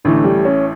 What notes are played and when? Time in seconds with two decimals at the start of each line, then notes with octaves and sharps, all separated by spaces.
0.05 A1 A2 D3 E3 A3
0.24 G3
0.45 C#4